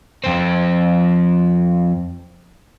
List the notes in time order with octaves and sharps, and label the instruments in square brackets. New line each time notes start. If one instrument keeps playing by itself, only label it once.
[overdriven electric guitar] F2 C4